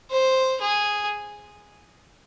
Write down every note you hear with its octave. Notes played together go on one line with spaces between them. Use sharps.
C5
G#4